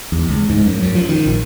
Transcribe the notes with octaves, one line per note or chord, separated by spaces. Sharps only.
E2
C#2
G#2
F#2
F#2
F3
D#3
A#1